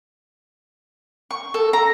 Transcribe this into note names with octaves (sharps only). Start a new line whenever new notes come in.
C#6
A4
A#5